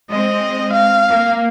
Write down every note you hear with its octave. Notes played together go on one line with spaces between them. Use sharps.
G#3 C4 D#5
F5
A#3